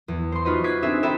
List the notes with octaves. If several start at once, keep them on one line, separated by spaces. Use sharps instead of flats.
E2
C5 C6
D#4 F4 F#4 B4 C5 D#5
D6 F#6 G#6 B6 C7 D#7
C4 D4 G#4 A4 C5 E5
D#4 E4 A4 C5 E5 G5